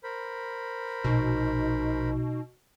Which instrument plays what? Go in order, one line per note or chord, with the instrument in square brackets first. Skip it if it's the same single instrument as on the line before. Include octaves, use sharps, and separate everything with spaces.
[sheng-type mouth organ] A#4 C5 B5
[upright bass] A#1 [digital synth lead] B2 [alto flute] D#4